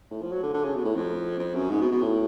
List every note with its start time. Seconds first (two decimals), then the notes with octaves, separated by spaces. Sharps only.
0.11 A2
0.22 F3
0.32 F#3
0.43 D3
0.54 D3
0.64 C#3
0.75 B2
0.85 A2
0.96 F2
1.39 F2
1.55 F#2
1.70 G#2
1.82 B2
1.92 B2
2.02 A2